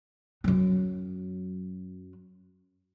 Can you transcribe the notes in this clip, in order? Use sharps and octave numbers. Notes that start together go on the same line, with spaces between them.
F#2 F#3